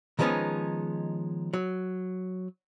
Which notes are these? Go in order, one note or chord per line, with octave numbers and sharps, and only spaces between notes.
D#3 F3 G#3 B3 C#4 D#4
F#3